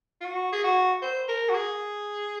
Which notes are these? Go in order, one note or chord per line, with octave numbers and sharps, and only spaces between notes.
F4
F#4
G#4
F#4
C5
A#4
F#4
G#4